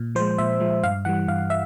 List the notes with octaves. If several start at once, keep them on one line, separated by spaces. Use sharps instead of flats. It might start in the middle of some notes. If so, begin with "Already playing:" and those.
Already playing: A#2
F3 G#3 C5
A#2 E5
F3 G#3
G2 F5
E3 G3 F#5
G2 F5
E5